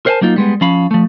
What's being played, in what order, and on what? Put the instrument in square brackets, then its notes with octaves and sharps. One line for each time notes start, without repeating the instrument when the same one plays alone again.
[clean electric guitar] A#4 C5 D5 F#5 G#5 A5
F#3 A#3 D#4 F4
G3 G#3 B3
F3 C#4 F5 B5
F3 A3